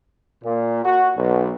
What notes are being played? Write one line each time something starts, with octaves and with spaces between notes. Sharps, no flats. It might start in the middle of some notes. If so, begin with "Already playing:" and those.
A#2
F#4
B1